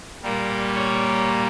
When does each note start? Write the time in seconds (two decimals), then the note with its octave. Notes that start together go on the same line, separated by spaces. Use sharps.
0.23 A#2 G3 A#3
0.75 C#5